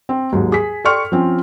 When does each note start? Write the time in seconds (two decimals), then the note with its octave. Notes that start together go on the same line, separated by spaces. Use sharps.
0.09 C4
0.32 D#2 G#2 F#3
0.52 G#4 B6
0.85 A4 D5 G5 C6 C#6 F6
1.12 F3 C4 C#4 F4